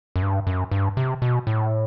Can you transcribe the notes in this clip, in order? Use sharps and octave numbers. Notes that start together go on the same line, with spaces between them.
F#2
G2
F#2
G2
C3
B2
A2